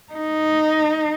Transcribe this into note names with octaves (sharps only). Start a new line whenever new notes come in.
D#4